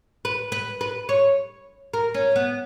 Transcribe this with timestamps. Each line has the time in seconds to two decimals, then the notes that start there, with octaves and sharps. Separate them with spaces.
0.25 B4
0.52 B4
0.81 B4
1.09 C#5
1.93 A#4
2.14 C#4
2.36 B3